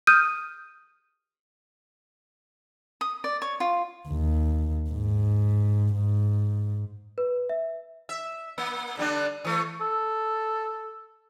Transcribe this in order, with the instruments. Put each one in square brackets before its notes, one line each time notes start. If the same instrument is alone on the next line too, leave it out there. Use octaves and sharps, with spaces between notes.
[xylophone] D#6 F6 G6 D#7
[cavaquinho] D#6
D5
C#5
F4
[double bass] D#2
G#2
G#2
[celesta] B4
E5
[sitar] E5
A#3
D3 G3 D4
E3 A3
[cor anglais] A4